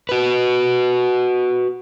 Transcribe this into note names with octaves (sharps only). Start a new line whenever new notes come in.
F#4 B4